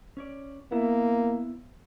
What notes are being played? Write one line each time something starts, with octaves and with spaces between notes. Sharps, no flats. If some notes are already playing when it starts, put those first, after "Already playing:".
C#4 C#5 D5
A#3 B3 E4